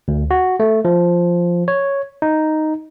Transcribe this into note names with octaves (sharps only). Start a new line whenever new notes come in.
D2
F#4
A3
F3
C#5
D#4